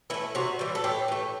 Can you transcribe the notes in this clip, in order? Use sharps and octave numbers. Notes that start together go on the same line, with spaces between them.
E3 A3 E4
C3 F#4
E3 G3
A4
A2 G4
E3 A3